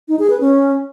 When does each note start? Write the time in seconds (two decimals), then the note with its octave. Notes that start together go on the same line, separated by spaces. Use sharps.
0.08 D#4
0.19 G#4
0.30 B4
0.41 C#4